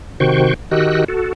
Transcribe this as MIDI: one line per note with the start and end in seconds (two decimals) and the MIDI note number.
0.20 0.54 48
0.20 0.54 51
0.20 0.54 66
0.20 0.54 72
0.20 0.54 79
0.20 0.54 85
0.71 1.04 51
0.71 1.04 66
0.71 1.04 67
0.71 1.04 75
0.71 1.04 88
0.71 1.04 90
1.08 1.33 66
1.08 1.33 69